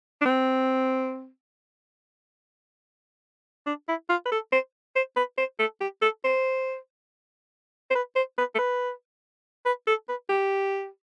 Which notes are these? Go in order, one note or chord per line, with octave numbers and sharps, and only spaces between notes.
D4
C4
D4
E4
F4
B4
A4
C5
C5
B4
C5
A4
G4
A4
C5
C5
B4
C5
B4
A4
B4
B4
A4
B4
G4